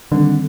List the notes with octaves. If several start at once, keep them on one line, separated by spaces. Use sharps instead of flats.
D3 D#3 G3 C4